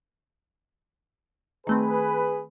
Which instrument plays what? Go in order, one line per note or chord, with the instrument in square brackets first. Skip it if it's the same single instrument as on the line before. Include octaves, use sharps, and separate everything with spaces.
[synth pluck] D#3 A3 C4 [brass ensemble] G#4 B4